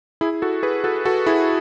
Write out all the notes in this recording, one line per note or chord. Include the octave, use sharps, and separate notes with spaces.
E4 G#4
F#4 A4
G#4 B4
F#4 A4
F#4 A4
E4 G#4